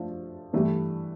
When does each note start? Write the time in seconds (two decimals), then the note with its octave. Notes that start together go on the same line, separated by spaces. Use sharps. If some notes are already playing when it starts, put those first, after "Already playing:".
Already playing: F3 A3 D4 F4 A4
0.53 G2 E3 A3 E4 G4